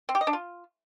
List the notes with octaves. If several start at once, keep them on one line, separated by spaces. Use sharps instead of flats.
C4
G4
D#5
D4
F4